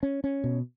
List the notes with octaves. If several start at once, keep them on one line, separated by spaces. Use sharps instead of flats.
C#4
C#4
B2